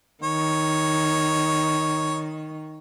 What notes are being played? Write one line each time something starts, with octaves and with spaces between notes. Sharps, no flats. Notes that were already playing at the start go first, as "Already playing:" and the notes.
D#3 C#5